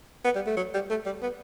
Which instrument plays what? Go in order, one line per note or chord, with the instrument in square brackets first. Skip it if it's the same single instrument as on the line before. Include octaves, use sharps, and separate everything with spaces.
[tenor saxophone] B3
G3
A3
F#3
G3
A3
G3
B3